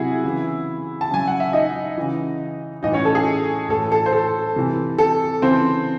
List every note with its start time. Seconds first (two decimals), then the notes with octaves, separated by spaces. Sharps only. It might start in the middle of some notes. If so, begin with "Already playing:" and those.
Already playing: C3 F#3 E4 F#4 G#4
0.24 C#3 E3
1.01 A5
1.11 C#3 F#3 G#5
1.27 F#5
1.40 E5
1.53 D#4 D#5
1.97 C#3 E3
2.83 A2 E3 D#4 D#5
2.93 C#4 C#5
3.05 A4
3.15 G#4
3.69 A2 E3 A4
3.92 A4
4.06 C5
4.13 A4
4.56 C3 E3
4.98 A4
5.42 C#3 E3 C4 C5